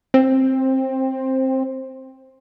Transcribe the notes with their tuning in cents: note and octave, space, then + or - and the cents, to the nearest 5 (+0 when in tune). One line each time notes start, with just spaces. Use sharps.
C4 +10